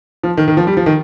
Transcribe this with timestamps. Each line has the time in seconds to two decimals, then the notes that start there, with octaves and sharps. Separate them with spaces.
0.23 F3
0.37 D#3
0.48 D#3
0.57 F3
0.67 G3
0.77 F3
0.86 D#3